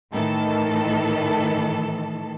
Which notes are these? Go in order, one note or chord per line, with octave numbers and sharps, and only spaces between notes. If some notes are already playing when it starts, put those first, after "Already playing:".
A2 D#3 E3 A4